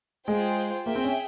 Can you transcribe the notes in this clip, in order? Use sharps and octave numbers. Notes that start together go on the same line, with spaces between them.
G#3 F4 G#4 C5 G5
A#3 G#4 E5 G5
C4
C#4